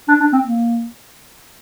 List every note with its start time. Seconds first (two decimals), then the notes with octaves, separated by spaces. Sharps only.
0.08 D4
0.20 D4
0.33 C4
0.45 A#3